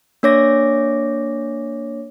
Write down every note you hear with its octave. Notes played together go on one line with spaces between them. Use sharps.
A#3 D4 C#5 D6 A#6